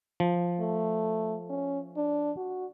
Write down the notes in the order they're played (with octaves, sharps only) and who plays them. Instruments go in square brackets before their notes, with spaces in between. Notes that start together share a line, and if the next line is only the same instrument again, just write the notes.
[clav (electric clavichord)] F3
[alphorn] A3
C#4
D4
F#4